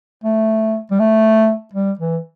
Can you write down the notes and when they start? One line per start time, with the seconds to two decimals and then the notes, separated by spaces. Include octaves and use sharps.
0.24 A3
0.91 G3
0.99 A3
1.74 G3
1.99 E3